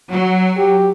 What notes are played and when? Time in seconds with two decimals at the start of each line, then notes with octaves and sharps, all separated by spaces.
0.11 F#3
0.58 G4